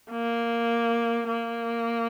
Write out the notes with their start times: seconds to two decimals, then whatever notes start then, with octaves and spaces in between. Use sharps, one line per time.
0.11 A#3
1.27 A#3